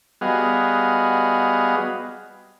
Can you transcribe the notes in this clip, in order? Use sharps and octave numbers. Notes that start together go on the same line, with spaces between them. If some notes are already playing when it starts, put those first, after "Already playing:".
G3 B3 F#4 G#4 D#5 F5